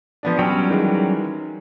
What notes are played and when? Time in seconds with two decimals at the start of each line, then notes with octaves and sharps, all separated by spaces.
0.23 F3 B3 D4
0.39 F#3 G3 C#4 G5
0.70 D#3 E3 G#3